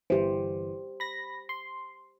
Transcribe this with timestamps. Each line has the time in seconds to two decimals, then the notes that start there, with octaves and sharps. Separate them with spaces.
0.10 G1 E3 G4 C5
1.00 B5 A#6
1.49 C6